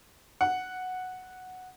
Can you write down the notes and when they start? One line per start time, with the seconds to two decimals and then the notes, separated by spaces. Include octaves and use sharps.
0.41 F#5